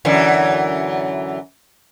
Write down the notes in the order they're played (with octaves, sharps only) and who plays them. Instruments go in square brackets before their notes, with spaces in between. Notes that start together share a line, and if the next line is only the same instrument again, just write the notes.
[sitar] F#2 D3 E3